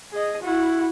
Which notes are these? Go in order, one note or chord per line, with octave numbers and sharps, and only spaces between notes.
G#4 D#5
E4 F#4